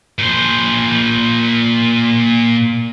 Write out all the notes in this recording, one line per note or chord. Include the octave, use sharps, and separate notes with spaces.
A#2 C5